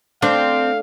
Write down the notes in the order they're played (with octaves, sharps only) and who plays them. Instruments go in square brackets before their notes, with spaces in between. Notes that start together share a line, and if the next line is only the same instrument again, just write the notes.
[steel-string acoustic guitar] A3 [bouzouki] C4 [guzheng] D4 [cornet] F5